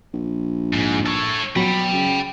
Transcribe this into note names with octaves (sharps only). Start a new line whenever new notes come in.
A#1
G#2
A4 C#5
B2 F#3 G5 B5
C#3